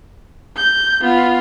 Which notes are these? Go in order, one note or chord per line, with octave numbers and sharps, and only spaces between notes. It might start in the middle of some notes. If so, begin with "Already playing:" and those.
G6
B3 F4